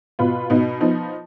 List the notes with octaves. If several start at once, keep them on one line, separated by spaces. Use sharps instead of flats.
B2 B3 F4 B4
B2 B3 D#4
F3 B3 D#4